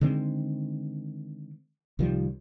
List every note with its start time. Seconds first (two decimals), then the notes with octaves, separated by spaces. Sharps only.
0.01 D3 D#3 G#3 C4
1.99 C2 D#3 F3 G3